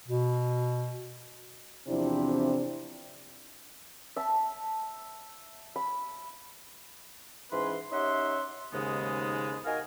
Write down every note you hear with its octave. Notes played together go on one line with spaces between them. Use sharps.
B2
E2 C3 F3 C4 D4 E4
E5 A5
B5
G#2 E3 C#4 B4 C6
C#4 D#4 G4 E5 F#5 C6
D#2 G#2 C#3 G#3 B3 C#4
D#4 F#4 A#4 F5 G#5